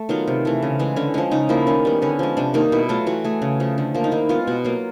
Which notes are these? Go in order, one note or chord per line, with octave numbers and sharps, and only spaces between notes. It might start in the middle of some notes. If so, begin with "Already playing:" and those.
Already playing: A3
D#3 F#3 B3 F4
C3
E3 A3
C#3
E3 G#3
D3 C#4
F3 G#3 C#4
C#3 D#4
F3 A#3 E4
D#3 C#4
G3 B3
D3 C#4
F3 G#3
C3 D4
D#3 G3 A#3 D#4
B2 E4
F#3 A3 F4
E3 F#4
A3 G#4
C#3
F3 A3
D3
F3 A#3
D#4
D#3 E4
G#3 B3 F4
B2 F#4
F#3 A#3 F4